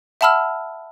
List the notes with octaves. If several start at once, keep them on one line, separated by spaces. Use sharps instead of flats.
E5 F#5 A5 B5 E6 F6